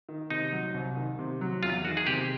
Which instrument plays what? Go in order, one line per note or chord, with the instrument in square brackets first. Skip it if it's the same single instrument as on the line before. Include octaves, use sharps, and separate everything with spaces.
[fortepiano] D#3
[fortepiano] C3 [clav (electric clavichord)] D#4
[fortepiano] F#3
C2
D#3
C3
F#3
[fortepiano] E2 [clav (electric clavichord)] F4
[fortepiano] D#3 [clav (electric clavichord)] F#4
[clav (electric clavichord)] G#4
[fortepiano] C3 [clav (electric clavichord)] G4